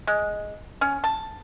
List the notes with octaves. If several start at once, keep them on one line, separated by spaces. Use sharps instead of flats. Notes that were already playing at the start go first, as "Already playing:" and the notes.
G#3
C#4
A5